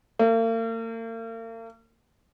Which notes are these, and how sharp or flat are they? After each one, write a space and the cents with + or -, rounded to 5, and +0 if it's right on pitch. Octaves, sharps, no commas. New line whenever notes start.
A#3 -45